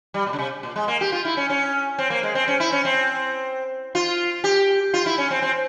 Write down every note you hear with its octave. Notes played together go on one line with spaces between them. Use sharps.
G3
A#2
C#3
C3
A#2
G#3
A#3
G4
F4
E4
C#4
C#4
C4
A#3
G#3
C4
C#4
E4
C#4
C4
F4
G4
F4
E4
C#4
C4
C4